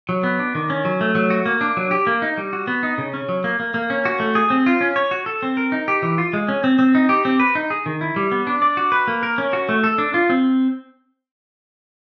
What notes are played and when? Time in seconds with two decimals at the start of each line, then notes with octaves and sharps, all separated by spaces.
0.09 F#3
0.23 B3
0.39 D4
0.55 D#3
0.70 C#4
0.85 F#3
1.01 A3
1.15 F#3
1.30 F#4
1.46 A#3
1.61 D4
1.77 F#3
1.91 G4
2.07 A#3
2.22 D#4
2.37 G3
2.53 F#4
2.67 B3
2.83 D#4
2.98 C#3
3.14 C#4
3.29 F#3
3.44 A#3
3.60 A#3
3.74 A#3
3.90 C#4
4.05 F#4
4.20 A3
4.35 G#4
4.50 C4
4.66 F4
4.81 C#4
4.96 C#5
5.11 F#4
5.26 A4
5.43 C4
5.57 A#4
5.72 D#4
5.88 G4
6.03 E3
6.18 F4
6.33 G#3
6.48 C#4
6.64 C4
6.79 C4
6.95 D#4
7.09 G4
7.25 C4
7.40 B4
7.55 D#4
7.70 G#4
7.86 D#3
8.01 E4
8.16 G3
8.32 B3
8.47 D4
8.62 D5
8.77 F#4
8.92 B4
9.07 A#3
9.23 A#4
9.38 C#4
9.53 F#4
9.69 A3
9.84 A4
9.98 D4
10.14 F4
10.30 C4